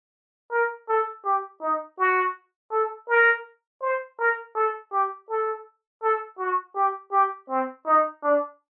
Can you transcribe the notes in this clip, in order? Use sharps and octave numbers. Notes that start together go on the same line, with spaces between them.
A#4
A4
G4
D#4
F#4
A4
A#4
C5
A#4
A4
G4
A4
A4
F#4
G4
G4
C4
D#4
D4